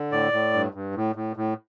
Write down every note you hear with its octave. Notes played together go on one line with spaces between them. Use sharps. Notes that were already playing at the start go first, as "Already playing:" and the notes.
Already playing: D3
A2 D5
A2
G2
G2
A2
A2
A2